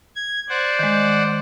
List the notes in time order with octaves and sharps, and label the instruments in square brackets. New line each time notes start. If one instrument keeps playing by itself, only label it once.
[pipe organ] G#6
C5 D5 F#5
[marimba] D#3 G#3